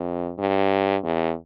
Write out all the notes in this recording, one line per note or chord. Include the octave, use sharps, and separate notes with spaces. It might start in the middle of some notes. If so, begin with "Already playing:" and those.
Already playing: F2
G2
E2